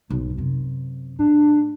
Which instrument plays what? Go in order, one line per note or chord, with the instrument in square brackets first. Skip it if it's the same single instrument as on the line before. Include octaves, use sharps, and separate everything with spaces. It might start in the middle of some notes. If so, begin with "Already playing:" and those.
[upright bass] B1 G#2
F#2 C3
[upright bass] A2 [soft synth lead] D4